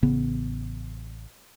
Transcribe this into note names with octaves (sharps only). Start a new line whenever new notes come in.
A1 C#3 B3